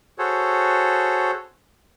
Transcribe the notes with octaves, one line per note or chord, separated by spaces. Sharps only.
F#4 G#4 A4 C5 C#5